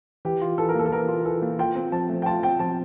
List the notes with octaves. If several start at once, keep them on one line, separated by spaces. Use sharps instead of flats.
E3 G4
F4
E3 A4
A#4
A#3 A4
A4
E3 A#4
F4
E3 A4
A#3
F4 G5
C4
F3 A5
A3
G5
F4 A5
C4 G5
F3 A5